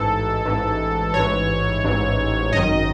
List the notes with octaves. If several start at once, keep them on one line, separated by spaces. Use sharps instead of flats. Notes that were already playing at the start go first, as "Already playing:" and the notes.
Already playing: A1 G#2 E3 A4
A1 G#2 E3
A1 G#2 E3 C#5
A1 G#2 E3
G#1 F#2 D#3 D#5